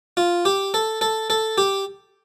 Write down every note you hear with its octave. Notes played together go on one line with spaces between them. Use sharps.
F4
G4
A4
A4
A4
G4